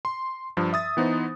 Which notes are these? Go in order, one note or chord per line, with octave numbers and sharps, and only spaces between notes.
C6
G2 F3
E5 D#6 A6
E3 B3 D#4 C5